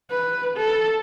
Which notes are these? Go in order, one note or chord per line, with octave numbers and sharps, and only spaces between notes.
B4
A4